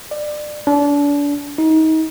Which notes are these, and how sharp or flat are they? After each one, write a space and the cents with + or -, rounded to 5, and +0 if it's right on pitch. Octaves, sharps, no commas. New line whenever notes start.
D5 +25
D4 -35
D#4 +30